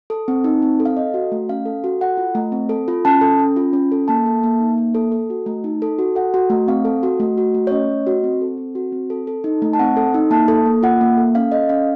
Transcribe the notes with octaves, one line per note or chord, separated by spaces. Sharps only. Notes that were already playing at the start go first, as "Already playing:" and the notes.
A4
C4
D#4
C4
A4
F5
A4 D#5
F#4
A3
C#4 F5
A4
F#4
A4 F#5
F4
A3
C4
A4
F4
C#4 A5
A4
C#4
F4
C#4
A4
A#3 A5
A4
A#3
D#4
A#3
A4
A4
F#4
A3
D#4
A4
F#4
A4 F#5
F#4
A3
C4 F5
A4
F#4
A3
F#4
A3
C#5
C#4 D#5
A3
F#4
C4
A4
C4
F#4
C4
A4
A4
D#4
A3
A5
C4 F#5
A4
D#4
A#3 A5
A4
A#3
F4 F#5
A#3
A4
C#4 F5
A4 D#5
C#4 F5